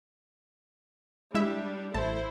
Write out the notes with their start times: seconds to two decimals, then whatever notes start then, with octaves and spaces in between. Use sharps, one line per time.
1.35 G3 G#3 D4 E4 E5
1.94 A1 E4 A4 C5 A5